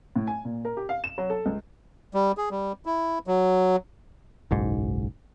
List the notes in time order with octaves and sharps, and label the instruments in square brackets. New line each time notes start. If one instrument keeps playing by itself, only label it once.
[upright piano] A2
G#5
A#2
A#4
G4
F5
E7
F#3
A4
C#2
[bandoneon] G3
G#4
G3
E4
F#3
[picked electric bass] F#1 B1 G#2